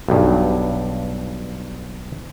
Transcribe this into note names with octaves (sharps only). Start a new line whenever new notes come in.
B1 G2